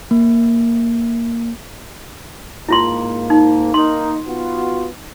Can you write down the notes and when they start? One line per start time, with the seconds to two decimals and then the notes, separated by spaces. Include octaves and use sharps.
0.11 A#3
2.69 G#2 A#3 E4 F4 C6
3.30 D#4
3.74 A#3 D#4 C6
4.27 B3 F4 F#4